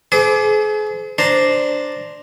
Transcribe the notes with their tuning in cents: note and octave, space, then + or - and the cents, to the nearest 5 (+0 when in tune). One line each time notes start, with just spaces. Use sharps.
G#4 +40 C5 -35 D6 +0
D4 +0 C5 +0 A#5 +0